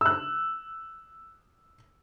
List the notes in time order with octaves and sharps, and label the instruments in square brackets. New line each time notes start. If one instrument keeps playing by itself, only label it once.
[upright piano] E6 F#6